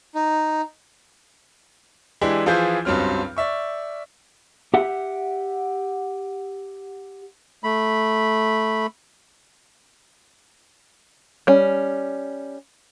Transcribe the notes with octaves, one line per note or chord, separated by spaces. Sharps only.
D#4
E3 G#3 D4 E4 G4
E3 F3 E4 F4 G#4 G6
C#2 G2 F#3 C4 C#4 F6
D5 E5 C#6
G4 E5 F#5
A3 B5
G3 C#4